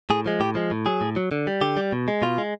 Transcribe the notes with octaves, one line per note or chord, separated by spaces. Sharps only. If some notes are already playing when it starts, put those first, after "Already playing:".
A2 G#4
F3 G#3
A2 G4
F3 G#3
A2
F#3 G#4
A2
F#3
D3
G3
D3 G4
G3
B2
G#3
B2 F4
G#3